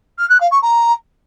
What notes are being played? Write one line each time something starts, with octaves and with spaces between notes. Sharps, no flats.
F6
F#6
F5
C#6
A#5